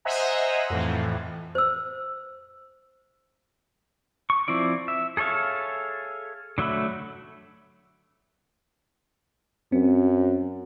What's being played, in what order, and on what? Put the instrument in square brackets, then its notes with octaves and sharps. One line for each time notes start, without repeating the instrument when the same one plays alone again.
[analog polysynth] C5 D#5 E5 F#5 G#5 A#5
F2 A2 E3
[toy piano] C5 E6
[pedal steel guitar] C#6
F3 C4 E4 D5
E5
G#4 A4 C#5 E5 F5
D3 F#3 A3 E5 B5
[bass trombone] F#2 [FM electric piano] C4